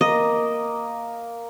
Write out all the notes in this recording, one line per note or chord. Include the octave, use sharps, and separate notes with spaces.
A#3 D#5